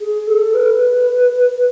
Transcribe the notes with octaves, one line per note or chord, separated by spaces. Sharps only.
G#4
A4
B4